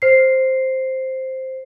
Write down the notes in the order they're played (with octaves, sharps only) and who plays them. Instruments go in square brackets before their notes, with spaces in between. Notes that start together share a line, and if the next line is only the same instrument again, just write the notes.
[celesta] C5 C7